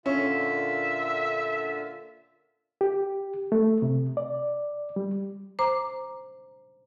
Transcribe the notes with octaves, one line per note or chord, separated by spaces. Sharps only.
A#2 D3 C#4 F4 E5
G4
A3
C3
D5
G3
C5 A#5 D6